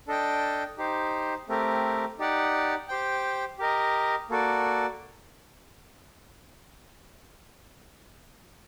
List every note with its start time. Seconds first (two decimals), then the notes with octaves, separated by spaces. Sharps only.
0.08 D4 A4 D#5 G5
0.78 D#4 G4 C5
1.49 A3 C4 G4 A#4
2.19 D#4 G4 D5 F#5
2.88 G4 C5 G5
3.59 G4 A#4 D#5
4.30 A#3 F#4 A4 D5